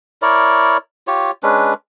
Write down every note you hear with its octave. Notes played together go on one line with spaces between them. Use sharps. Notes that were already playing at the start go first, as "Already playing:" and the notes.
E4 A#4 C#5 D5
F4 G4 C#5
G#3 C#4 D4 B4